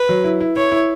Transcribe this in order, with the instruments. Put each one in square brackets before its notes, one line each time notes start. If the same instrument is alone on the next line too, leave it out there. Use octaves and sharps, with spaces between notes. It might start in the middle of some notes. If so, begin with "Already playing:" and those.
Already playing: [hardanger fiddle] B4
[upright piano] F#3
E4
E4
[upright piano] E4 [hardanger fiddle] C#5
[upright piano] E4